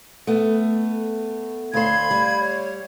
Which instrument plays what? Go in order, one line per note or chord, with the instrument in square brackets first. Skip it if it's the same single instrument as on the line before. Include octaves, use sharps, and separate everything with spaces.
[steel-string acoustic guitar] A3 B3
[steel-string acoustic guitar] D2 C5 [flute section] F5 B5 G#6
[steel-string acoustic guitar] G3
[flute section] C#5